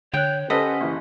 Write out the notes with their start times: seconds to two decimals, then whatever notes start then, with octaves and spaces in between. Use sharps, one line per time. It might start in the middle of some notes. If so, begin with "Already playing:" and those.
0.14 D3 C#5 G5 F#6
0.50 C#4 G4 A4 B4 C5 D#5 F#5 B6
0.80 F#1 E3